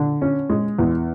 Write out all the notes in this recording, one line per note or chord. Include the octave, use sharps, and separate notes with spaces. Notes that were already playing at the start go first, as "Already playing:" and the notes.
Already playing: D3
C#4
G#3
E2